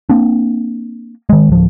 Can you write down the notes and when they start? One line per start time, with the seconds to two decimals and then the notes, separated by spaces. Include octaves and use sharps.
0.09 A#3 C4 D4
1.29 D#3 G#3
1.49 D1 F3